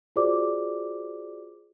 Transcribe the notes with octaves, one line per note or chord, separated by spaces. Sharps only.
F4 F#4 G#4 C5 D5 D6